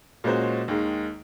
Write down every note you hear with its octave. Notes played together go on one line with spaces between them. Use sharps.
A#2 G#3 C#4 F#4 C5
D#2 D#3 G#3